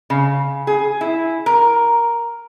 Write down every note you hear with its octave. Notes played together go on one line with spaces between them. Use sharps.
C#3
G#4
E4
A#4